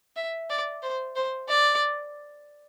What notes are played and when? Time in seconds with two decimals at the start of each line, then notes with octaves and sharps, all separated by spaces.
0.16 E5
0.50 D5
0.83 C5
1.16 C5
1.48 D5